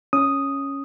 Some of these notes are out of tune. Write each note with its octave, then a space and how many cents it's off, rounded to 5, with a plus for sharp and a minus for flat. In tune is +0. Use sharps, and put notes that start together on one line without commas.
C#4 +0 D#6 +0